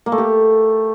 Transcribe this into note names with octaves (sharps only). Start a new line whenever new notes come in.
A#3
A3
G4